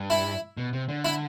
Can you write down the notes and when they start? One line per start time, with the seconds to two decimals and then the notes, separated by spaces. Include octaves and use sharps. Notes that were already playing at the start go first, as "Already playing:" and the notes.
Already playing: G2
0.10 E4
0.57 B2
0.73 C3
0.88 D3
1.05 E4